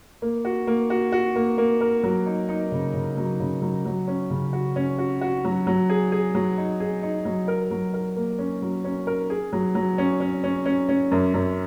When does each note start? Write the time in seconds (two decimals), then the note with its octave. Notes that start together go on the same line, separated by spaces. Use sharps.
0.22 A#3
0.45 F#4
0.67 A#3
0.90 F#4
1.12 F#4
1.36 A#3
1.58 A#3
1.81 A#4
2.03 F#3
2.26 D#4
2.49 D#4
2.72 C#3
2.94 C#3
3.17 F#3
3.40 C#3
3.62 F#3
3.85 F#3
4.08 C#4
4.30 C#3
4.53 F#4
4.76 C#4
4.98 F#4
5.21 F#4
5.45 F#3
5.67 F#3
5.89 G#4
6.12 G#4
6.35 F#3
6.58 D#4
6.80 G#4
7.03 D#4
7.25 F#3
7.48 A#4
7.71 F#3
7.94 A#4
8.17 A#3
8.39 C#4
8.62 F#3
8.84 C#4
9.07 A#4
9.30 G#4
9.53 F#3
9.75 F#3
9.98 C#4
10.20 C#4
10.44 C#4
10.66 C#4
10.89 C#4
11.12 F#2
11.34 F#2